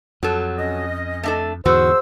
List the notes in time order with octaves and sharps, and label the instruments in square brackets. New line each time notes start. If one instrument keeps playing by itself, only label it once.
[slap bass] F2 [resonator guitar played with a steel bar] F#3 A4
[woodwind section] C#4 D#5
[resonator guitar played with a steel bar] A3 D4 A4
[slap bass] E2 G#2 D3 [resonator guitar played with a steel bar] F#4 [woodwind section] G#4 E6 [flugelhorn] C5